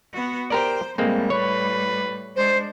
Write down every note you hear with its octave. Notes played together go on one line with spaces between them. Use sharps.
B3 F#4
G4 A#4 C5 D5
A2 G3 G#3 A#3 C4
B4 C#5
G#3 D4 C5